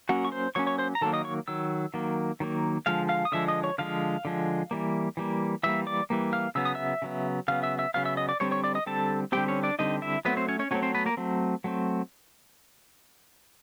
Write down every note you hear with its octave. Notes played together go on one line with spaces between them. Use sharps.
F#3 A#3 C#4 F#4 F#5
C#6
C5 C6
F#3 A#3 C#4 C#5 C#6
C#5 C#6
C5 C6
A#5
D#3 F#3 A#3 A4 A5
D#5 D#6
C#5 C#6
D#3 F#3 E6
D#3 F#3 A#3
D#3 F#3 A#3
D3 F3 G#3 F5 F6
F5 F6
D#6
D3 F3 G#3 E5 E6
D#5 D#6
C#5 C#6
D3 F3 G#3 F5 F6
D3 F3 G#3
E3 G3 A#3
E3 G3 A#3
E3 G3 A#3 E5 E6
D5 D6
E3 G3 A#3
F5 F6
C#3 F#3 B3 E6
D#6
E5 E6
C#3 F#3 B3
C#3 F#3 B3 F5 F6
E5 E6
E5 E6
C#3 F#3 B3 F5 F6
E5 E6
D#5 D#6
D5 D6
D3 G3 C4 C#5 C#6
C#5 C#6
D5 D6
D#5 D#6
D3 G3 C4 A4 A5
D3 G3 C4 G4 G5
C#4 C#5
D4 D5
D3 G3 C4 D#4 D#5
E4 E5
F#3 A3 B3 C4 B4
C4 C5
C#4 C#5
C#4 C#5
F#3 A3 C4 C#4 C#5
C4 C5
B3 B4
A#3 A#4
F#3 A3 C4
F#3 A3 C4